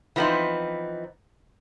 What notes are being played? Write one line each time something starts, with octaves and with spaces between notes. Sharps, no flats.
E3 F3 B3 C4 D#4